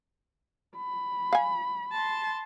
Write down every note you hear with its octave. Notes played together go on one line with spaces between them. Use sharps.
B5
F5 G#5
A5 C6